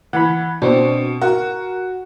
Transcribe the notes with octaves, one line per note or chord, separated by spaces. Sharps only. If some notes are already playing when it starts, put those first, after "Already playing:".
E3 F#5 B5
B2 C4 D4
F#4 A#4